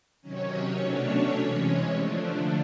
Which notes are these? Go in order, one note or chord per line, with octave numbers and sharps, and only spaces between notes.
C3 D#3 F#3 C#4 C#5
B2 F#3 A3 C#4 D4 C#5
C3 E3 G#3 C#4
D3 F3 A3 D4